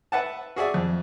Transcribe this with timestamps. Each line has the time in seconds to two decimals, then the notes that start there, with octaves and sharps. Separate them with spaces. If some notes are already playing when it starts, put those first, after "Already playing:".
0.12 B4 E5 F#5 A5
0.56 F#4 G#4 D5 E5
0.74 F2